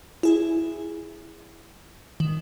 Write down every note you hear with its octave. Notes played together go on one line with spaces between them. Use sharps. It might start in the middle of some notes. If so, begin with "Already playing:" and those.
E4 G#4
D#3